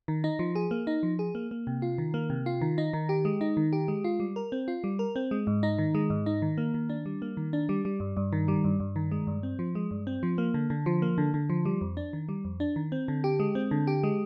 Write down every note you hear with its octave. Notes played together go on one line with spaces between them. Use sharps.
D#3
D#4
F3
G#4
A#3
D#4
F3
G#4
A#3
A#3
C3
F4
D#3
A#3
C3
F4
D#3
D#4
D#3
G4
G#3
D#4
D#3
G4
G#3
F4
G3
A#4
C4
F4
G3
A#4
C4
G#3
G#2
D#4
D#3
G#3
G#2
D#4
D#3
A#3
D#3
D4
G3
A#3
D#3
D4
G3
G3
G2
G2
D#3
G3
G2
G2
D#3
G#3
G2
C4
F3
G#3
G2
C4
F3
A#3
D3
D3
F3
A#3
D3
D3
F3
G3
F2
D4
D#3
G3
F2
D4
D#3
C4
D3
G4
G#3
C4
D3
G4
G#3